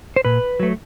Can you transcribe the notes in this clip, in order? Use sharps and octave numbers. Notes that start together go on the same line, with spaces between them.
C5
A#2 B4
F#3 A3